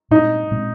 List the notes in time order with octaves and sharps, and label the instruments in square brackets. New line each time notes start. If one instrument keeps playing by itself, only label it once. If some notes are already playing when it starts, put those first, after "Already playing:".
[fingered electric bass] A#2 G#3 C4 [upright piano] D#4
[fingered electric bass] A#2 G#3 C4